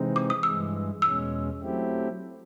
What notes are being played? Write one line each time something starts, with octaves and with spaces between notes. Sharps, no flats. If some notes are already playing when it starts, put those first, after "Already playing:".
Already playing: C3 E3 G#3 C4 D#4
D6
D#6
G2 E3 G#3 E6
E2 B2 G#3 C#4 E6
F#3 A3 C4 E4 G4